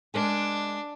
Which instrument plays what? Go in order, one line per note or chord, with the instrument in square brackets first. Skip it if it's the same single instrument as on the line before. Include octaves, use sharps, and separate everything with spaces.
[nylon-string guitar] G#3 A#4 G#5 [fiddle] D4